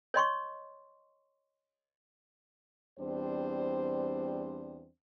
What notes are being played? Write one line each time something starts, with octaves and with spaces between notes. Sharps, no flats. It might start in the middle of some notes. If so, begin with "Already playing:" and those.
C#5 D#5 C6 C#6
E2 G3 C4 D4 C5